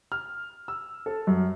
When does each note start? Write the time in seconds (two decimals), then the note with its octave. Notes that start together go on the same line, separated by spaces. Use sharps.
0.12 F6
0.68 E6
1.06 A4
1.27 F#2